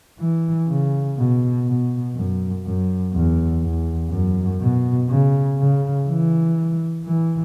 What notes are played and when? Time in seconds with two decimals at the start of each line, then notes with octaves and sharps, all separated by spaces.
0.19 E3
0.68 C#3
1.17 B2
1.67 B2
2.15 F#2
2.65 F#2
3.13 E2
3.62 E2
4.11 F#2
4.60 B2
5.08 C#3
5.58 C#3
6.08 E3
7.04 E3